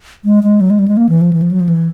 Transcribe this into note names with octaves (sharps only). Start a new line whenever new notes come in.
G#3
G#3
F#3
G#3
G3
G#3
A#3
E3
F3
E3
F3
F#3
F3
E3